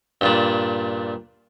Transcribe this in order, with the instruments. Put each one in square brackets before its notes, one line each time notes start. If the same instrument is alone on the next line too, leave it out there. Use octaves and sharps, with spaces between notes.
[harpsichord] G2 A#2 D4